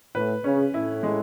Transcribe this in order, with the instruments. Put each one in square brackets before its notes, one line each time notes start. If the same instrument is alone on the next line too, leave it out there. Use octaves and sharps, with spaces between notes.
[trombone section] A2 [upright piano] B4
[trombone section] C#3 [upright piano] C#4
[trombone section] A2 [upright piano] E4
[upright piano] G#3